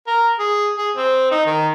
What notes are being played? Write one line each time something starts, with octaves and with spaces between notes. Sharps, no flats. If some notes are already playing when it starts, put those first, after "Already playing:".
A#4
G#4
G#4
C4
D#4
D#3